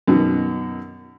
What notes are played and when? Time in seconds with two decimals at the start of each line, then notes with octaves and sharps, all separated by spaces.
0.08 F#2 B2 D#3